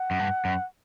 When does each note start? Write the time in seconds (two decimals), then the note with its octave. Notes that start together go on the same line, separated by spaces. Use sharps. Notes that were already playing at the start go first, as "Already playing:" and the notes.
Already playing: F#5
0.11 F#2
0.19 G2
0.45 F#2